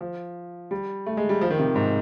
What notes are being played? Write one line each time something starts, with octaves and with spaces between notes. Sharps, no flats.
F3
G3
A3
G#3
G3
F3
D#3
C3
G#2